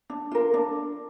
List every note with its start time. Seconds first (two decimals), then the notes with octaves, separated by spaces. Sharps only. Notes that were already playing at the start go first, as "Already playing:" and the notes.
0.10 D4
0.32 F4 A#4
0.54 D4